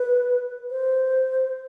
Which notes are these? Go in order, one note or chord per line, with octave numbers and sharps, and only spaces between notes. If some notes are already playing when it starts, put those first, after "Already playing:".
Already playing: B4
C5